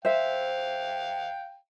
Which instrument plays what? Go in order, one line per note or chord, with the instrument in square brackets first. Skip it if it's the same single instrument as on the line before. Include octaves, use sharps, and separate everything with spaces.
[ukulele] C5 E5 [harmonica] F5 G5